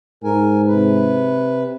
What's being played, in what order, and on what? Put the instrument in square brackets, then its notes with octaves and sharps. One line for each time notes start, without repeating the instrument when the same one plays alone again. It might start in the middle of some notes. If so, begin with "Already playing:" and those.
[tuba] G#2 [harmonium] A#4 G#5
[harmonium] C3 B4